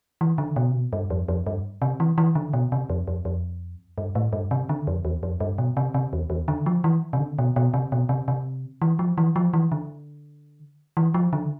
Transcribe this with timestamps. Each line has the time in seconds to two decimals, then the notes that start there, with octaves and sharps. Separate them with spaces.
0.21 E3
0.38 D3
0.56 B2
0.71 C3
0.74 B2
0.93 G2
1.10 F2
1.28 F2
1.47 G2
1.82 C3
2.00 E3
2.18 E3
2.35 D3
2.53 B2
2.72 C3
2.90 F2
3.08 F2
3.25 F2
3.98 G2
4.15 A2
4.33 G2
4.51 C3
4.69 D3
4.87 F2
5.05 E2
5.23 F2
5.40 G2
5.58 B2
5.77 C3
5.94 C3
6.13 E2
6.30 E2
6.48 D3
6.66 F3
6.84 E3
7.13 C3
7.20 D3
7.39 B2
7.56 B2
7.74 C3
7.92 B2
8.09 C3
8.28 C3
8.82 E3
8.99 F3
9.18 E3
9.36 F3
9.54 E3
9.72 D3
10.97 E3
11.14 F3
11.33 D3